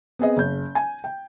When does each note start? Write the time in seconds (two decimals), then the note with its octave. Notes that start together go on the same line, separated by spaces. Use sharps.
0.19 B3 C4 G#4 D#5
0.37 F#1 G6
0.75 G#5
1.04 G5